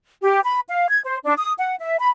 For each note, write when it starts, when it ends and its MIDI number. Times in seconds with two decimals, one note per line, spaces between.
0.23 0.40 67
0.44 0.60 83
0.69 0.87 77
0.90 1.00 92
1.05 1.17 72
1.24 1.34 62
1.38 1.53 87
1.58 1.75 78
1.79 1.97 76
1.99 2.09 83